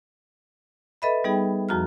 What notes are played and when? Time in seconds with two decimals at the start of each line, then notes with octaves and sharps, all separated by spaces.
1.02 A4 B4 D#5 E5 B5
1.24 G3 B3 D#4 G#4 G5
1.69 F2 F3 F#4 A#5 F6